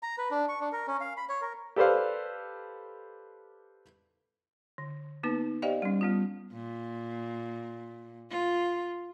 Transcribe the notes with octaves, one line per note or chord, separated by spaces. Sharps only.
A#5
B4
D4
C#6
D4
A#4
C#4
F5
B5
C#5
A#4
G4 A4 B4 C5 D5 F5
D3
A#3 B3 D#4 B4
G4 C5 D5 D#5 F5 G5
G3 C#4
G3 B3 F4
A#2
F4